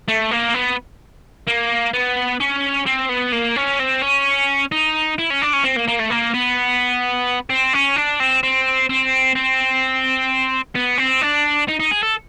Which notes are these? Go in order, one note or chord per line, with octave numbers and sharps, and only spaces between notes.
A3
A#3
B3
A#3
B3
C#4
C4
B3
A#3
C#4
C4
C#4
D#4
E4
C#4
D4
C#4
C4
A#3
A#3
A3
A#3
B3
C4
C#4
D4
C4
C4
C4
C4
B3
C4
D4
D#4
D#4
G#4
A4